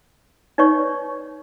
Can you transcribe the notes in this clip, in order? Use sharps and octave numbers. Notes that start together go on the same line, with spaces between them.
D#4 B4 C#5 D5 C#6